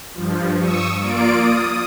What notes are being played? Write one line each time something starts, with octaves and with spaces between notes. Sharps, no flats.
G2 F3
C#6 D#6 E6
A#3 F4 D5 D7
D#6